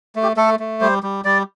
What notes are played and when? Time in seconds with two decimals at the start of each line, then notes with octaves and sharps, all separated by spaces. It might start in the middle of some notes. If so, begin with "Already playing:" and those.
0.15 A3
0.23 G4
0.37 A3 A4
0.59 A3
0.81 G3 C5
1.03 G3
1.25 G3 D5